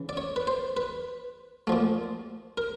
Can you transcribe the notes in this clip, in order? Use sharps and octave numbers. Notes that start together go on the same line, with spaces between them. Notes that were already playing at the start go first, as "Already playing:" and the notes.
Already playing: C#3 E3
D5
C#5
B4
C5
B4
A#2 F3 A3
A#4